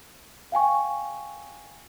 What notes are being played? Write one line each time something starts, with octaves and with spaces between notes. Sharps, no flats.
F5 G5 G#5 C#6